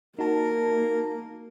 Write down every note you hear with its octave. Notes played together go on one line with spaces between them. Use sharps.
A#3 D#4 F#4 A#4 A5